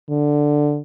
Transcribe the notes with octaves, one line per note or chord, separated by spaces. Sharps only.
D3